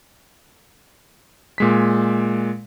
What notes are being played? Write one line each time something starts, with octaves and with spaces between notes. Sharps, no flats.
A#2 G#3 B6